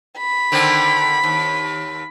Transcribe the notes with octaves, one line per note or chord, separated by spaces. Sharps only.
B5
D3 D#3 C4
D#2